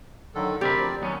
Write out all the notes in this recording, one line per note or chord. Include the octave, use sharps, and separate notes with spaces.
D3 D#3 F#3 A4
D2 C3 C4 G4 A#4 D5 B5
F3
D#2 F#3 B3 C#4